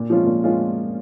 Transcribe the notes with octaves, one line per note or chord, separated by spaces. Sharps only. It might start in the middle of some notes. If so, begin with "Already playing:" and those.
Already playing: A#2
F3 G#3 C#4 F4
A#2
G#3 C#4 F4